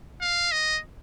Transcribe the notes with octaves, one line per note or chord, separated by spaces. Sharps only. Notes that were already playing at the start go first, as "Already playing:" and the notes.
F5
D#5